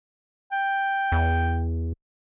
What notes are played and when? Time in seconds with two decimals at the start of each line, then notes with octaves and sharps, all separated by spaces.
0.52 G5
1.12 E2